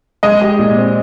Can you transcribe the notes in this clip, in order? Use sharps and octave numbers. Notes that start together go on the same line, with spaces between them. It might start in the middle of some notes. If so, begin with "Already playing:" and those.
G#3 D#5
G4
A#2
C4